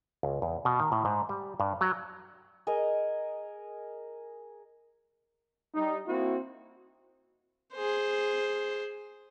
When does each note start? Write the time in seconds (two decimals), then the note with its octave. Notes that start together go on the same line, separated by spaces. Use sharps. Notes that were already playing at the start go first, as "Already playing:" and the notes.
0.23 C#2
0.42 E2
0.65 B2
0.80 D#3
0.92 A2
1.05 G#2
1.29 G3
1.60 G2
1.81 F#3
2.67 G#4 A#4 D#5 G#5
5.75 G3 D#4
6.07 A#3 C4 E4 F#4
7.74 G#4 C5